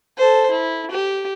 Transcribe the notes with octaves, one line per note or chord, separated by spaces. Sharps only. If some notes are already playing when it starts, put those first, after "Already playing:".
A4 C5
E4
G4